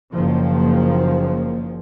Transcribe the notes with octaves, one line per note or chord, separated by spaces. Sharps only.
F#1 D#3 F3 A#3